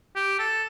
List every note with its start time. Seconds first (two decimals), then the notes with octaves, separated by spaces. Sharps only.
0.16 G4
0.39 A4